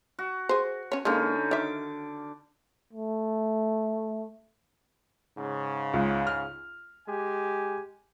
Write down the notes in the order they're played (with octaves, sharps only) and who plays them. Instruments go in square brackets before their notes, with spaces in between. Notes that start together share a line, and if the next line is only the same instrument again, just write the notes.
[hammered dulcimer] F#4
[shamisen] G#4 C5
C#4 C#5
[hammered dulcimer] D3 C#4 D#4 [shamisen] G#3 A#3
[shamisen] D#3 E5 [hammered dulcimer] D6
[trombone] A3
[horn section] G#2 C#3
[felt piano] C#2
F6
[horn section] G#3 G4 G#5